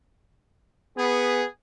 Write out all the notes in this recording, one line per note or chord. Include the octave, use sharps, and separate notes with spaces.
B3 G#4